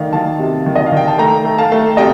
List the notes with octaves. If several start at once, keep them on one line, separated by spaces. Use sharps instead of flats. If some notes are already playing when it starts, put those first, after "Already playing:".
Already playing: D#3 A3 D5 F5
D#3 F5 A5
C3
D#3
D#5
F5
D#3 G5
A5
A3 G5 A#5
A3
F5 A5
A3
C3 D#5 G5